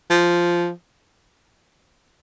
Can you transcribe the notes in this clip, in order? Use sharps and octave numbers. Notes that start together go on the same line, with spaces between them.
F3